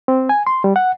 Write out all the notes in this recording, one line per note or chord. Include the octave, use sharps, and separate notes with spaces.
C4
G#5
C6
G3
F#5